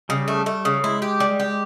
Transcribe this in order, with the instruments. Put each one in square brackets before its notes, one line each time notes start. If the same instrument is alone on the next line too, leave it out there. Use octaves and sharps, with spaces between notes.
[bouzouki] C#3 [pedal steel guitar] G3
[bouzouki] A3
A3
C#3
[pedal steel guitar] G#3 [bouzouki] E4
[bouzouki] G4
G3
G4